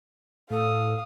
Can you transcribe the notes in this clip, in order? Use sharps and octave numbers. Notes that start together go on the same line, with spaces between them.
A2 A4 F5 D#6